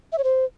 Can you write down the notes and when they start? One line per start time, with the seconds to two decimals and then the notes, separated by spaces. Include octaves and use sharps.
0.12 E5
0.18 C#5
0.24 C5